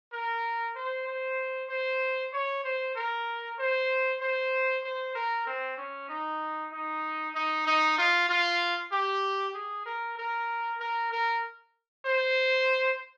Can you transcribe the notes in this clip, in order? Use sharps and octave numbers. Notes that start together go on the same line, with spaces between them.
A#4
C5
C5
C5
C#5
C5
A#4
C5
C5
C5
A#4
C4
C#4
D#4
D#4
D#4
D#4
F4
F4
G4
G#4
A#4
A#4
A#4
A#4
C5